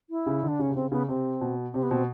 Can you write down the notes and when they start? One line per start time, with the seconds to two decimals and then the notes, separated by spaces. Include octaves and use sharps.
0.10 E4
0.26 C#3
0.43 D3
0.48 D4
0.59 C#3 C#4
0.70 C3
0.75 C#3 C4
0.92 C#3 B3
1.08 C3 C4
1.41 B2
1.73 C3 C4
1.83 B3
1.91 B2 C4